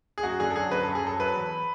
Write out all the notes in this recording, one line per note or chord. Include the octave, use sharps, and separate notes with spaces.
G#4
F#2 F#4
D3 G#4
A4
F#3 G#4
F#2 B4
F#2 A4
G#4
F#3 A4
F#3 B4
E2